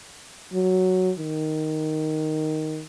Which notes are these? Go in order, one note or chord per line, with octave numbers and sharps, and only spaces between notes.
F#3
D#3